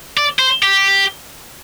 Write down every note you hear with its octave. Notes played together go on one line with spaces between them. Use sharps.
D5
C5
G4